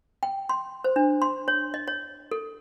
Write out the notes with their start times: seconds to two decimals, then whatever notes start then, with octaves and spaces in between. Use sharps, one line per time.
0.23 G5
0.49 C6
0.84 C5
0.96 D4
1.22 C6
1.48 C#5
1.74 D#5
1.87 C#5
2.31 A4